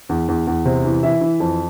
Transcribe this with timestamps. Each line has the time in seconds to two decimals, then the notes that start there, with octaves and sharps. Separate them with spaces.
0.09 E2
0.28 E2
0.47 E2
0.65 C3
0.85 E3
1.03 E3 E5
1.21 E3
1.40 F2